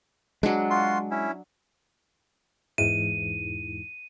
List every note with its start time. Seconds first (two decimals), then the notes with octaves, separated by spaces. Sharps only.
0.43 F#3 G#3 D4
0.70 F4 F#4 C6
1.11 C#4 E4
2.78 E2 G#2 E3 D#7